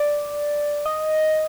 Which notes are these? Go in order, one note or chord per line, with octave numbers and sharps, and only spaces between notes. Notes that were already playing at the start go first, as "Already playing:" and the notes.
Already playing: D5
D#5